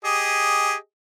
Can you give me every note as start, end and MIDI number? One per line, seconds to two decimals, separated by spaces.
0.04 0.75 67
0.04 0.75 68
0.04 0.75 75